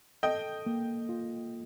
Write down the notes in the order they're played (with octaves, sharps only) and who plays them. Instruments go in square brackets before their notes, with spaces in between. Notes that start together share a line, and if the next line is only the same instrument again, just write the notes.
[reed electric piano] A4 [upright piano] D#5 G5
[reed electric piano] A#3
F4